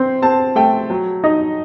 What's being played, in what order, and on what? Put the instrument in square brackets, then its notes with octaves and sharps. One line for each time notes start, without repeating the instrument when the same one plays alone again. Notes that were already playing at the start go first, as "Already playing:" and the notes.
Already playing: [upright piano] C4 C6
C4 A5
A3 G5
F#3
D#4 D#5